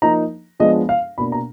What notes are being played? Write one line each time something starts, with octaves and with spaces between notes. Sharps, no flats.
F3 A#3 D#4 A#5
F3 G#3 B3 D4 D#5
F5
B2 A#3 D4 B5
A#5